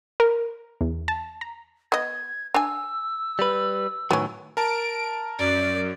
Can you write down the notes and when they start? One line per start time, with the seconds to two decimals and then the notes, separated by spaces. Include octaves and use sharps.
0.20 A#4
0.81 E2
1.08 A5
1.41 A#5
1.92 B3 D#5 G#6
2.54 D4 G#5 E6
3.39 G3 B4
4.11 A2 D#3 F#3 B3 C#4
4.57 A#4 A5 D7
5.39 F#2 D5